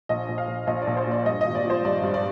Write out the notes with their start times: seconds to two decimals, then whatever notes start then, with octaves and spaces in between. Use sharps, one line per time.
0.09 A#1 D#5
0.28 A#1
0.38 F5
0.48 A#1
0.67 A#1 D#5
0.82 D5
0.87 A#1
0.97 C5
1.06 A#2 D5
1.26 G2 D#5
1.41 G#1 D#5
1.55 D5
1.65 F3 C5
1.85 G2 D5
2.03 G2
2.14 D5